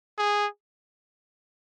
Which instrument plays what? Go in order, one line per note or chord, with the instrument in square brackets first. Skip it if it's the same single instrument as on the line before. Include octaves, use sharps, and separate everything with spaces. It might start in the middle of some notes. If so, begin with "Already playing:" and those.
[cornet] G#4